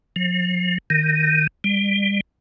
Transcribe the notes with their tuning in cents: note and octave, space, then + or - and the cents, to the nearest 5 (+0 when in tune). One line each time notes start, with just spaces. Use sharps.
F3 +45
D#3 -10
G3 +30